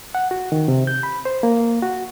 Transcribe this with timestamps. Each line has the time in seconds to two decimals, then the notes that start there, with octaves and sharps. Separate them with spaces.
0.15 F#5
0.31 F#4
0.52 D#3
0.68 C3
0.87 G6
1.03 B5
1.25 C5
1.43 A#3
1.83 F#4